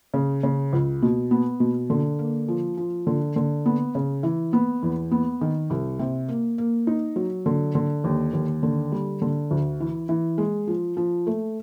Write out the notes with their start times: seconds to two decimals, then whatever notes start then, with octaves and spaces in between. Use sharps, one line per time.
0.14 C#3
0.43 C#3
0.73 C#2
1.02 B2
1.31 B3
1.60 B2
1.90 D3
2.19 A#3
2.48 F3
2.77 F3
3.07 D3
3.36 D3
3.66 B3
3.95 C#3
4.23 E3
4.53 B3
4.82 E2
5.11 B3
5.41 D#3
5.70 C2
5.99 C3
6.29 A#3
6.58 A#3
6.87 D#4
7.16 F#3
7.46 D3
7.75 D3
8.04 D#2
8.33 D#2
8.63 D3
8.92 G3
9.22 D3
9.51 D2
9.80 E3
10.09 E3
10.38 G#3
10.67 F3
10.97 F3
11.27 A3